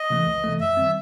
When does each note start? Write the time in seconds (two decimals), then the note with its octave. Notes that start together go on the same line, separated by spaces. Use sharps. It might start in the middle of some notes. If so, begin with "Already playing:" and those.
Already playing: D#5
0.10 C3 E3 A3
0.27 C#2
0.44 C3 E3 A3
0.60 F#2 E5
0.77 D#3 G3 C4